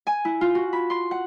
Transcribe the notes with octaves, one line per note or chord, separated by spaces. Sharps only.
G#5
E4
F4
F#4
B5
C6
F#5